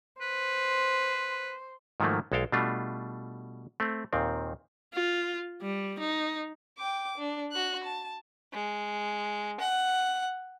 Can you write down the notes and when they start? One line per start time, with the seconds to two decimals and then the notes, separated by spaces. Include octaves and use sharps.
0.21 B4 C5
2.00 G#2 D#3 F3 F#3 A3 A#3
2.32 B1 G#3 A4 F5 G5
2.52 B2 G3 A3 D4 F4
3.80 A3 C4
4.13 D#2 A#2 D#3 C4
4.94 F4
5.62 G3
5.99 D#4
6.78 G5 D6
7.18 D4
7.52 F#4 F#6
7.84 A5
8.53 G#3
9.60 F#5